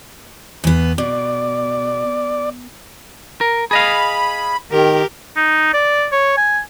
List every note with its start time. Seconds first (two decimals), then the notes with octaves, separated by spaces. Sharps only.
0.64 E2 B3
0.98 B2 D5
3.41 A#4
3.71 G#4 D#5 F5 B5
4.71 D#3 G4 A#4
5.36 D#4
5.74 D5
6.12 C#5
6.38 G#5